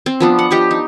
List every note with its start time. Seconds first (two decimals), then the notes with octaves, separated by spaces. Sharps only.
0.06 C4
0.20 F3 B3 D4
0.39 F#5
0.51 F3 D4 G4 D#5
0.71 D#4